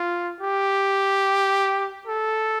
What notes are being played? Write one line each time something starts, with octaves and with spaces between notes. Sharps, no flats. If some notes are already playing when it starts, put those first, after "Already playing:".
Already playing: F4
G4
A4